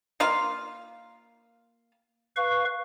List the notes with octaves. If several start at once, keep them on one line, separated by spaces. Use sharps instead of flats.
A#3 F4 F5
B4 F5 C#6